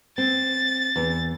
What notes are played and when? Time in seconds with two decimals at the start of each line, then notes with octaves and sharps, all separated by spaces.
0.18 C4 A6
0.96 E2